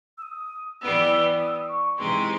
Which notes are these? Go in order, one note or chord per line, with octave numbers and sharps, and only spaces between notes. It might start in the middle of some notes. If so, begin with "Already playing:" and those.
E6
D#6
E3 G3 B3 E6
D#6
E6
D#6
C#6
C3 E3 G#3 C4 D#4 C6